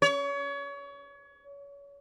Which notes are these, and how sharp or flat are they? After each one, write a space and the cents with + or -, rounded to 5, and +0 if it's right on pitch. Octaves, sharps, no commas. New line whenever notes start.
C#5 +30